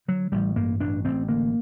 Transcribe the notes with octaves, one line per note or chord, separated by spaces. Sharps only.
D3 F#3
A1 G3
G2 A#3
A1 D4
A1 C4
D3 A#3